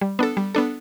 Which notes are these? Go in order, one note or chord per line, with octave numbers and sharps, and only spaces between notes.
G3
B3 D4 A4
G3
B3 D4 A4